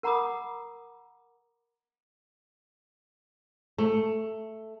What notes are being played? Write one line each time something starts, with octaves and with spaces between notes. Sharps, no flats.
A#4 F#5 A#5 B5 D6 D#6
A3